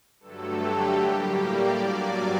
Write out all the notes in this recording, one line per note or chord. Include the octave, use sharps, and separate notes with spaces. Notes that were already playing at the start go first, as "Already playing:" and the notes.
G2 D3 F#3 A3 A4
G4
A2 G3 A#3
D5
G2 F#3 A#3 D5